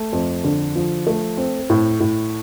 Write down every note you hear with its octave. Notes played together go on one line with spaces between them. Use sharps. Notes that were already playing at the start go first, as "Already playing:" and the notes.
Already playing: A3
F2
D3
F3
A3
C4
A2
A2